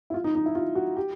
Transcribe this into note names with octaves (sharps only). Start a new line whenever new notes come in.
E4
F4
D#4
D#4
E4
F4
F#4
G4